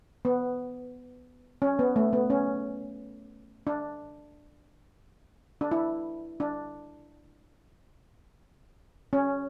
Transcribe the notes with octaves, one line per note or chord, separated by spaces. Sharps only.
B3
C#4
B3
A3
B3
C#4
D4
D4
E4
D4
C#4